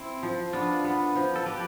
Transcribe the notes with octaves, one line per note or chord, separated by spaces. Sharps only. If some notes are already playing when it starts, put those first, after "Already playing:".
Already playing: C4 E4
F3
B3 D4 F4
B3
F3
A4
F3 G4 B4